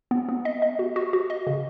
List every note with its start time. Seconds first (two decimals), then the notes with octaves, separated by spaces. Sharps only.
0.11 B3
0.29 B3
0.45 D#5
0.62 D#5
0.79 F#4
0.96 F#4
1.13 F#4
1.30 D#5
1.47 C#3